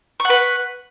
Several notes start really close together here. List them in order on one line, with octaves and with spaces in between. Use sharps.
C#6 F#5 B4